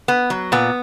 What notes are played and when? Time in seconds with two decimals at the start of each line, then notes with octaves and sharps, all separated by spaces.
0.08 B3
0.30 F#3
0.52 A#2 B3